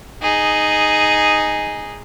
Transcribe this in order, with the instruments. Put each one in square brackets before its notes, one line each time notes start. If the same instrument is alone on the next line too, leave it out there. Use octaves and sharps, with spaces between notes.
[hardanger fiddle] D#4 G#4